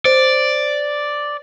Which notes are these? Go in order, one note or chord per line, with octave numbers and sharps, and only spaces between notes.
C5 D5